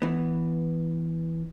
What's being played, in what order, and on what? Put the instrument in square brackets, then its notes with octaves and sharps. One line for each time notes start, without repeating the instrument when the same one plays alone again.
[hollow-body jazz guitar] E3 B3